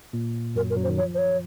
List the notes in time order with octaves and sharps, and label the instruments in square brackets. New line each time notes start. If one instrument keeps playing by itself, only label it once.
[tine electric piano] A#2 A#3
[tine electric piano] F#2 F#3 [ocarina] A#4
[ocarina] A#4
[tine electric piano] F#2 F#3
[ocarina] C5
[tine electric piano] D#3
[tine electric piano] F3 [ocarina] C#5
[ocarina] C5
C#5